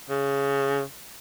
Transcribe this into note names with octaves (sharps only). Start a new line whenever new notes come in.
C#3